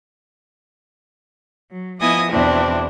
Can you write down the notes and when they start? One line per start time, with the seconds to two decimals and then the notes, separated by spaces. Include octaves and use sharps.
1.71 F#3
2.01 F3 B3 E4 D#5 G#5 D#6
2.31 E2 B2 C4 D4 E4